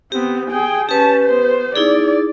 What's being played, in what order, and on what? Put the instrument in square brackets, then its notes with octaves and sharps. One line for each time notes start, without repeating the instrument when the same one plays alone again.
[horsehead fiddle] B3 C4 [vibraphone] G4
[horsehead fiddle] G#4 G5
[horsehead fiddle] C#4 A5 [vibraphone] G4 B4
[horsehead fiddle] B3 C5
[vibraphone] D#4 E4 G#4 [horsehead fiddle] D5